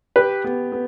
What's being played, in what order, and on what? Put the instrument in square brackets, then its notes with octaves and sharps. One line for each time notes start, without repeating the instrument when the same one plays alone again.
[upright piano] G4 [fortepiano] B4
[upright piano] B3
B3